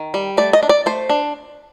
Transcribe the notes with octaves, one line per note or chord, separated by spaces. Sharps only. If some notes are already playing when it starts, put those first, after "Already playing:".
Already playing: D#3
G3
A3 D5
D#5
D4
D5
A3 C5
D4